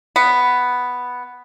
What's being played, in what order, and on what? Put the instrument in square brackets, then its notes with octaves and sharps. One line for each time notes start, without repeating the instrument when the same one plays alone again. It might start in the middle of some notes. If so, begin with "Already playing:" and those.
[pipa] B3